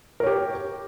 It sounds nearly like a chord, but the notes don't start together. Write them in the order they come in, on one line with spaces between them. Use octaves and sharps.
A#4 C#5 G4